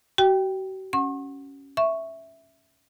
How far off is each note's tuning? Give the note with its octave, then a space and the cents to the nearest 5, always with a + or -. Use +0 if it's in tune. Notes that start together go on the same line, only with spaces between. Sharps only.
F#4 +45 G5 +0
C#4 +0 F#5 -10 C#6 -45
E5 +0 C#6 +0